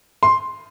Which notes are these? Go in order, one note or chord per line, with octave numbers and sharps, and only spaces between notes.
C6